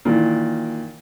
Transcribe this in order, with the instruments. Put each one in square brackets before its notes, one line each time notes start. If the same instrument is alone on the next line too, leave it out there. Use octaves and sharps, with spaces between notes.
[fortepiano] A#2 D#3 E3